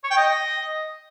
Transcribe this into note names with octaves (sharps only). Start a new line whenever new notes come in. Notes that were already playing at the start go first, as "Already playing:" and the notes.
C#5
G5
D#5